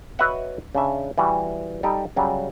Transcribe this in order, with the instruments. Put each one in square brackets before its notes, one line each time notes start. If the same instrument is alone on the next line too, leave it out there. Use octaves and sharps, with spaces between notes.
[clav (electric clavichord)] F#4 B4 C#5 D#5 E5 F#5
C#3 D4 E5
E3 G3 F#4
G3 D#4 G4 A4
C#3 F#3 G3